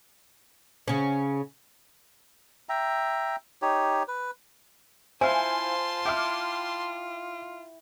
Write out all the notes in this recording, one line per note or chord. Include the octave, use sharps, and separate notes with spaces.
C#3 C#4
E5 G5 A#5
D#4 G4 C#5
B4
E4 F4 C5 F5 G#5 A5 C6
E4 G5 D6 F6